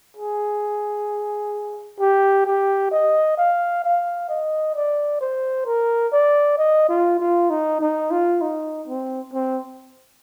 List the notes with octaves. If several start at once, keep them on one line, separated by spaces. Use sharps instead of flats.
G#4
G4
G4
D#5
F5
F5
D#5
D5
C5
A#4
D5
D#5
F4
F4
D#4
D#4
F4
D#4
C4
C4